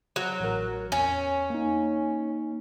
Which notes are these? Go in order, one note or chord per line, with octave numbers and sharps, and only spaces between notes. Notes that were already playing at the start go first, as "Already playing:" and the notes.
F#3
A1 A#4
E2 C#4
A#3 D#4